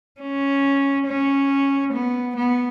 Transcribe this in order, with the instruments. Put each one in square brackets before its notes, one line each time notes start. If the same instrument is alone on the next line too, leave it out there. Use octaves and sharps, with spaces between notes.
[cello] C#4
C#4
B3
B3